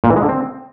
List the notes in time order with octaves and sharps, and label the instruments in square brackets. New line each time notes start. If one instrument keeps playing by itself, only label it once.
[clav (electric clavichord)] A#2
E3
G#3
D3
C4